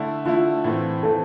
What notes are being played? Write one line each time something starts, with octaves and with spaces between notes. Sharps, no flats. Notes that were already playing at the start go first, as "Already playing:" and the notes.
Already playing: D3 A3 E4
D3 A3 E4 F4
A2 E3 A3 C4
A2 E3 A3 C4 A4